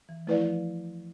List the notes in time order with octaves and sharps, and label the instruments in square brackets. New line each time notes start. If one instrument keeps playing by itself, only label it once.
[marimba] E3
[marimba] F3 [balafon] A3 E4 B4 D5
[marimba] F3